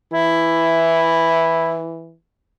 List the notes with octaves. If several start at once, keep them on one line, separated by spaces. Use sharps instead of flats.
E3 E4